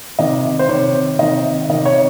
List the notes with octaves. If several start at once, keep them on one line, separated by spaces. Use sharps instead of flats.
C3 D#3 D#5
C5
C3 D#3 C#5
C3 D#3 D#5
C3 D#3 D#5
C#5